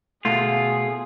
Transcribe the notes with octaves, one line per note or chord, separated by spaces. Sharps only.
B2 A3 F4 G#4